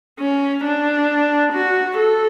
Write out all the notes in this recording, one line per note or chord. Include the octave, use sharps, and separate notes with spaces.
C#4
D4
F#4
A4